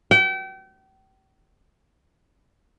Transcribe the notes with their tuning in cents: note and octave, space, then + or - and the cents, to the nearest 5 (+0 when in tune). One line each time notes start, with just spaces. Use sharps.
G5 -35